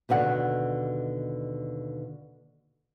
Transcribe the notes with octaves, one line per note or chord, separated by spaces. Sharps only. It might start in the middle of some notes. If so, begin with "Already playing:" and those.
D#2 B2 D3 F#5